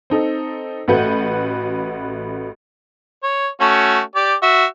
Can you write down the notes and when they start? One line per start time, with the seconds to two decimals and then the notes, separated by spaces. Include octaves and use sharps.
0.10 C4 D#4 A4
0.88 A1 A3 F#4 B4 F#5 G6
3.23 C#5
3.60 A3 C#4 F#4
4.16 G4 D5
4.42 F#4 E5